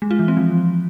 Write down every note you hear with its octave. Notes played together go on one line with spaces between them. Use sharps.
G#3
F4
E3
C4
F3